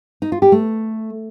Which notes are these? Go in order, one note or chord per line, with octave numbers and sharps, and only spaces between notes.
D#4
F4
G4
A3